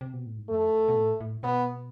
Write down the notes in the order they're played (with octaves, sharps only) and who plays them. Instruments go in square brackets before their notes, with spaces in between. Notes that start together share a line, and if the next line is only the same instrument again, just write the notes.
[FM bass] C3
B2
A2
G#2
[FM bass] F2 [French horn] A3
[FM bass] E2
F2
B2
A2
A2
[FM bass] B2 [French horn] B3